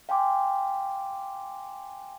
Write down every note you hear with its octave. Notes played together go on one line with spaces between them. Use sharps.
F5 G5 G#5 C6 D6